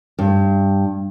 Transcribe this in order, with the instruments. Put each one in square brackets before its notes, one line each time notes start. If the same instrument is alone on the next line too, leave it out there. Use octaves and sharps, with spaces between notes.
[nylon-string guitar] G2